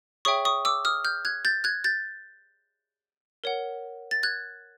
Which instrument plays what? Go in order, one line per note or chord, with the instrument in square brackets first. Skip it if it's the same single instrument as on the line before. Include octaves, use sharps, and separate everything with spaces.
[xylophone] G#4 C#5 E5 G5 C#6 D#6
C#6 D#6
D6 E6
D#6 F6
F6 G6
F#6 G#6
G6 A6
F#6 G#6
G6 A6
A#4 C#5 F#5
A6
F#6 G#6